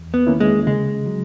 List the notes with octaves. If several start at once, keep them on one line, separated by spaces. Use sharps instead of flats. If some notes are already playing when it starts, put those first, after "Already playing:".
Already playing: E2
B3
D#3 A#3 C#4 E4
G#3
C#3 G#3
F#3